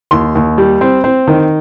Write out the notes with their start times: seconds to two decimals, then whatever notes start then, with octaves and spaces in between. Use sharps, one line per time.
0.11 D#2 C6
0.35 D#2
0.58 G3
0.81 C4
1.04 C4
1.27 D#3